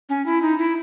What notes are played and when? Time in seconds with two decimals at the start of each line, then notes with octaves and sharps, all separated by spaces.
0.09 C#4
0.26 E4
0.42 D#4
0.58 E4